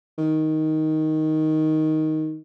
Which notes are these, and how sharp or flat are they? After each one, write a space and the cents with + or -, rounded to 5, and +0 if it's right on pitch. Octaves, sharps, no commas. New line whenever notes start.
D#3 +5